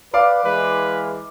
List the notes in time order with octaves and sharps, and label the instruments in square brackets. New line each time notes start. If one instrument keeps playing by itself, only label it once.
[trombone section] B4 [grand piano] D5 F5 D6
[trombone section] E3 G#3 [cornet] B4